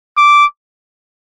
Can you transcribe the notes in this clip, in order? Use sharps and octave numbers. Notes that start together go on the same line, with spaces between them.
D6